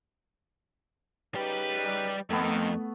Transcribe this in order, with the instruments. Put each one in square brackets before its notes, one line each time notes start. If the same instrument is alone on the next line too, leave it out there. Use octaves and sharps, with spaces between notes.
[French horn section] C#3 D#4 B4 [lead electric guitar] G3 G4
[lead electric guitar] F2 [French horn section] D#3 [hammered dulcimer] A3 B3